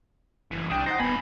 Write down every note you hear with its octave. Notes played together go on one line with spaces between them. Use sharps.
F#1 E3 F#3
C2 D4 G5 D#6
D#4 C5 F#5 A6 A#6
D#1 D#2 B3 G#5 B5